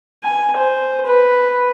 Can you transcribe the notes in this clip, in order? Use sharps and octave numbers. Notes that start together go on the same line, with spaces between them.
G#5
C5
B4